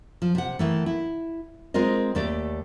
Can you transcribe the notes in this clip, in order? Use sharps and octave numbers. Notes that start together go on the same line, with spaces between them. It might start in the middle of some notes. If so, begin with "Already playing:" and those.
F3
C3 F#5
D#3 E3 A3
E4
G#3 C4 F4 A#4 D#5
D#2 A3 D5